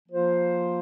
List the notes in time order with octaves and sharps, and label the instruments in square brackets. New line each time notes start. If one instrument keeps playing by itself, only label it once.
[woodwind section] F3 A#3 F4 C5